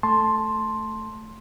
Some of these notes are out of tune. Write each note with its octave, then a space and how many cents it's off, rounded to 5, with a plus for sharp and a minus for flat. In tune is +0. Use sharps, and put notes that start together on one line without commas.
A3 +0 A5 +0 C6 +10